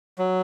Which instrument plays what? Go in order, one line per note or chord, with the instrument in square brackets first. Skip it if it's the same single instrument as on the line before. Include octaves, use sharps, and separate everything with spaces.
[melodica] F#3